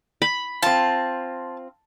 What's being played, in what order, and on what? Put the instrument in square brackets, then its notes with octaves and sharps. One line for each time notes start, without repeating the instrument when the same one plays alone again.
[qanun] B5
[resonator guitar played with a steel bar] C4 F4 [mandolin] A5